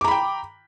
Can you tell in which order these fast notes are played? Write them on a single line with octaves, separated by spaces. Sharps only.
D6 A#5 B5 G5